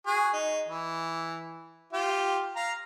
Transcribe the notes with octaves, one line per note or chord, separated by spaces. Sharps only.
F#4 G#4
D#4
E3
F4 G4
F5 A#5